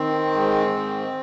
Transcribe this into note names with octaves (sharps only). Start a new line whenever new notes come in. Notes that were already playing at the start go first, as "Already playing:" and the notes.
Already playing: D#3 C4
G#2
D#3